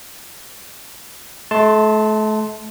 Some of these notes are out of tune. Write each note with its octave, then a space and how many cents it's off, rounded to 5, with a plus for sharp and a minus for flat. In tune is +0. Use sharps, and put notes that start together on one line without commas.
A3 -35 A5 +0 C6 +0